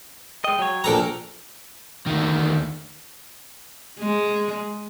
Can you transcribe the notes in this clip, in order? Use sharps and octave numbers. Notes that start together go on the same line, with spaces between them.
G#3 D#5 G5
F#3 C#5
A#1 D3 A4 A#4 A#5
D2 D#3
G#3